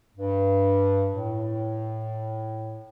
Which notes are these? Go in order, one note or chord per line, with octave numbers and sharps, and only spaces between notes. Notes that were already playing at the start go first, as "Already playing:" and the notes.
G2
A2